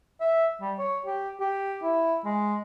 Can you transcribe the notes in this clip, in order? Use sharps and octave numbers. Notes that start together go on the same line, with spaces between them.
E5
G3
C#5
G4
G4
E4
G#3